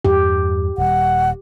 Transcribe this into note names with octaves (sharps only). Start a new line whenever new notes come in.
E2 G2 G4
D#1 G3 F#5